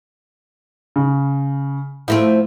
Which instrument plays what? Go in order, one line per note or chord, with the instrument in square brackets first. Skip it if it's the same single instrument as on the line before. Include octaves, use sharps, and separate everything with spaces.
[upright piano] C#3
[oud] F3 A3 C4 [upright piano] E4